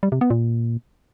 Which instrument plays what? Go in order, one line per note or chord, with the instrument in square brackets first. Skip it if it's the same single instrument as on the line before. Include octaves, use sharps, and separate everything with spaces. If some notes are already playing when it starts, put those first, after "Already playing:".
[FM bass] G3
C3
B3
A#2